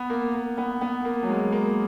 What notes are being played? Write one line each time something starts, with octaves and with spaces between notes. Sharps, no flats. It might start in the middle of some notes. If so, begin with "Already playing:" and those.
Already playing: B3
A#3
A#3
B3
B3
A#3
F#3
G#3
A#3